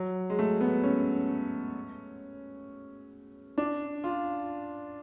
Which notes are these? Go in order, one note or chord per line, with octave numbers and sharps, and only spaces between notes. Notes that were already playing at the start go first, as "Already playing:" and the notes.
Already playing: F#3
G#3
A3
B3
C#4
D4
F4